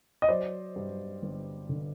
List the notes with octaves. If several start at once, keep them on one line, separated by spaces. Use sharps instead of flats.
D#5
F#3 C5 D5
G2
G1
D3